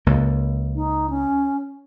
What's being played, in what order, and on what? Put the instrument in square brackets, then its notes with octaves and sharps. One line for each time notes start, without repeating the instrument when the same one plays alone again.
[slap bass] C#2 A#3
[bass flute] D#4
C#4